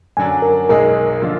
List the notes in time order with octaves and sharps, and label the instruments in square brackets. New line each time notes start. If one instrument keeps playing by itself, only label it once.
[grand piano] F#2 D3 F#3 D4 [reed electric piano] G#5
[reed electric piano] A#4
[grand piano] B1 B2 G#3 D#4 G#4 [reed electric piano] A#4
[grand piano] D3 F3 A#3 F4